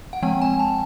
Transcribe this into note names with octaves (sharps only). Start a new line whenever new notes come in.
F#5
F3 G#3 C4 G5
G#5
A5